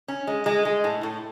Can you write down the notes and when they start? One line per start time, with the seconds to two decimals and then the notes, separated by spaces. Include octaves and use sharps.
0.08 C#4
0.27 G#3
0.46 G#3
0.65 G#3
0.84 A2
1.03 A2